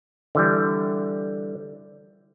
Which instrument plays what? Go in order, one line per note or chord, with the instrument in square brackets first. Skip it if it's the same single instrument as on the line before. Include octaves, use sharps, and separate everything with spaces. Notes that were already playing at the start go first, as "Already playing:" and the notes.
[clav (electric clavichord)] D3 E3 G3